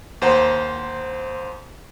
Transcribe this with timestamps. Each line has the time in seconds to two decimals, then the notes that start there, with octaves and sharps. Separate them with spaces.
0.22 D#2 C5 F#5 A#5